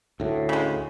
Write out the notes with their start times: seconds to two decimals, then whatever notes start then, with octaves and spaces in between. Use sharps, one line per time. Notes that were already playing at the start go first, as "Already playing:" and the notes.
0.20 D2 A2
0.49 C#3 G#3